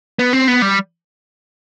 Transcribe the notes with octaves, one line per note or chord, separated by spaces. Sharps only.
B3
C4
B3
G3